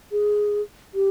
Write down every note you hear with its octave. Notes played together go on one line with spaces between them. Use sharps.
G#4
G4